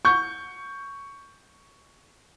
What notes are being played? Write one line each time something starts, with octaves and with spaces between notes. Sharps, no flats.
C#6 G6